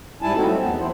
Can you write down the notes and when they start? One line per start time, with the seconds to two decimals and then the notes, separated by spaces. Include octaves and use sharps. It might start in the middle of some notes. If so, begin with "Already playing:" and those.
0.22 G#2 G3 E4 G#5 A5
0.36 C4 D#4 F#4 A4
0.47 F#3 A3 C4
0.61 E2 B3
0.79 E3 E4 C5